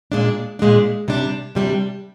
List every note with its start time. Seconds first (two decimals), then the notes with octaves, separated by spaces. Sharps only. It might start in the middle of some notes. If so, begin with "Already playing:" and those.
0.12 A#2 G#3 D4
0.59 A#2 G#3 D4
1.08 C3 G3 D4
1.55 C3 G3 D4